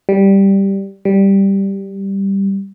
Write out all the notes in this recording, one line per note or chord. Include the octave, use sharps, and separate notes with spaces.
G3
G3